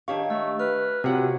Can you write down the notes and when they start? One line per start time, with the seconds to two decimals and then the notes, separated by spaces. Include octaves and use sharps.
0.08 D#3 D4 G4 C#5 F5 C#6
0.30 A3 E6
0.59 B4 F6
1.04 C3 F4 F#4 C#5 F#5